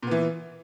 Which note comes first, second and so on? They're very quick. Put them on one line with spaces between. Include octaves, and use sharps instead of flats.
A#2 B3 E3